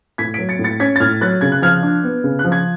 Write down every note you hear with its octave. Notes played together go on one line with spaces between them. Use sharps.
A2 G#6 B6
F#3 B6 D7
A6 C#7
A2
A6 C#7
C#4 G#6 B6
A6
A2 F6 G#6
F#3 F#6 A6
C#3 G#6
F#6
F3 F6 G#6
D4
B3
C#3
F#6
F3
G#6